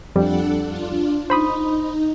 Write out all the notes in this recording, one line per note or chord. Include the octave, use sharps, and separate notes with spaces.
F2 G3 D4 A4 F#5
D4 F4
D#4 C5 B5 D#6